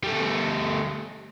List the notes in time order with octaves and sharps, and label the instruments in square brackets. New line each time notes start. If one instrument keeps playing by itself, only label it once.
[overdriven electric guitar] G3 A3